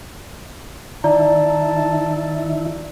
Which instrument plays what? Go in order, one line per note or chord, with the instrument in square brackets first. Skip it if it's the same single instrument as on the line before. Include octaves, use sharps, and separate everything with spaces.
[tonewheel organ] D#3 E4 [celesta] D5 A#5 [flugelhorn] A5